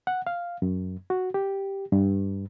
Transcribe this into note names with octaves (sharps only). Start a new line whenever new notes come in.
F#5
F5
F#2
F#4
G4
G2